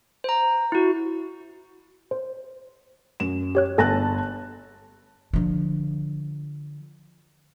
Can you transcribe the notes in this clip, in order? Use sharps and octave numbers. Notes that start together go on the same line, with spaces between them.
C5 A#5
E4 F#4
C5
F#2 E7
G4 C#5 F#6
G1 A4 G#5 A5 F#6 A#6
D3 F3